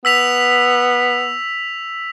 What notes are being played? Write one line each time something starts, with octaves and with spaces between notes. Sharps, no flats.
B3 E6 B6 F7